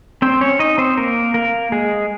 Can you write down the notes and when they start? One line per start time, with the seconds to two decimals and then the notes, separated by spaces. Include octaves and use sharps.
0.22 C4 C5
0.41 C#4 C#5
0.59 D#4 D#5
0.78 C4 C5
0.97 A#3 A#4
1.34 A#3 A#4
1.72 G#3 G#4